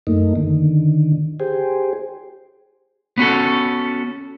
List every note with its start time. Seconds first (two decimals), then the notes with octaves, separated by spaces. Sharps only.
0.07 F#2 A3 A#3 D#4
0.35 D3 D#3
1.40 G4 G#4 C5
3.18 B3 C#4 F#4 A4